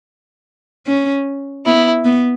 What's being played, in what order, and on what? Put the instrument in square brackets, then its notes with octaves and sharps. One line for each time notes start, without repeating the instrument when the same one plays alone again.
[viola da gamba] C#4
[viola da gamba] B3 [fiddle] E4
[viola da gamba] B3